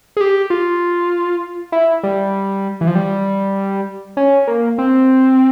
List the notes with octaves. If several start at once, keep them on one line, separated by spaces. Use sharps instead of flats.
G#4
G4
F4
E4
G3
E3
F3
G3
C#4
A#3
C4